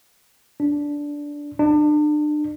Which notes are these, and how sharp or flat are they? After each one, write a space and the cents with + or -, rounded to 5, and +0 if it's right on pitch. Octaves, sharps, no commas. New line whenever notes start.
D4 -10
D4 +35